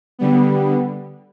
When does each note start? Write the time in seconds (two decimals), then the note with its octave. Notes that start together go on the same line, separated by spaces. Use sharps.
0.19 D3 G3 B3